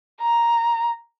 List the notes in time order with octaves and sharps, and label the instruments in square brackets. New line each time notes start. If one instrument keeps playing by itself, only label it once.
[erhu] A#5